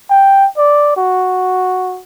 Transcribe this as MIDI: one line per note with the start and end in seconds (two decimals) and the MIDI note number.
0.11 0.47 79
0.57 0.94 74
0.97 2.01 66